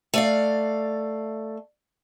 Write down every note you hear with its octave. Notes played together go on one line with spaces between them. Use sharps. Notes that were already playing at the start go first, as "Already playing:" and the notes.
A3 D5 F5